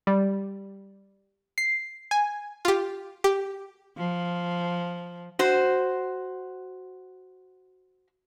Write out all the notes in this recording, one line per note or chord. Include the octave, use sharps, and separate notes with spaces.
G3
C7
G#5
F4 G4
G4
F3
F#4 C5